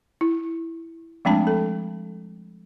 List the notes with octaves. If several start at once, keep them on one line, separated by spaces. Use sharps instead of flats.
E4
F3 G#3 A3 C4 D4 A5
A4